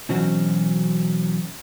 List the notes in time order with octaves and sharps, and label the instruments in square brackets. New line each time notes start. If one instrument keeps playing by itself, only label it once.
[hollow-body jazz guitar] B2 E3 F#3 C4 C#4 F#4